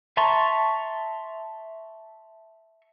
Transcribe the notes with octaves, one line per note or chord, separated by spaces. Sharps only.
E5 A5 A#5 C6 C#6